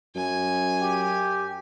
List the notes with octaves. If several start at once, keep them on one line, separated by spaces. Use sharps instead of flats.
F#2 G#5
G4